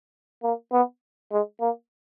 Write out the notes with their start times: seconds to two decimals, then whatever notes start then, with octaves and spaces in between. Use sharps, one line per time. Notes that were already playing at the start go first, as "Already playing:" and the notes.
0.43 A#3
0.73 B3
1.32 G#3
1.61 A#3